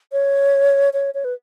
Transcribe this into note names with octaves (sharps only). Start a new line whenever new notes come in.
C#5
C#5
C#5
B4